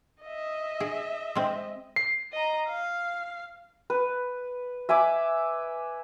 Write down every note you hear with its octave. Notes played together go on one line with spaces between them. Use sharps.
D#5 E5
G#4
G#3 C4
C7
D#5 A#5
F5
B4
E5 G#5 B5 D6